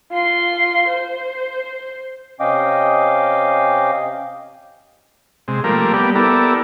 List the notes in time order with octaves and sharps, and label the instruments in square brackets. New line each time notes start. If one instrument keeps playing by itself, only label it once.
[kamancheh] F4 C6
C5
[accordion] C3 C#4 D#5 F5 G5 D6
[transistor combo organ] C3 G#3
F3 G3 A3 A#3 A#4
G3 A#3 B3 G4 D5
B3 E4 G4 A4 A#4 D5